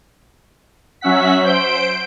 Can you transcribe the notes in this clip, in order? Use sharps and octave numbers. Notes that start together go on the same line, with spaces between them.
F#3 C#4 E5 F#5 B6
C5 G6 D7